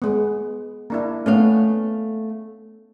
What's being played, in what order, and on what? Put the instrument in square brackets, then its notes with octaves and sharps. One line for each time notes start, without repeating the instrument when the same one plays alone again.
[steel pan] G#3 B3
A#3 D4 E4
[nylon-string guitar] A3 F5 [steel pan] B3 C#4